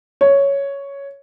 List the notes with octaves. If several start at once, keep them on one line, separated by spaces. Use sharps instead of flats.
C#5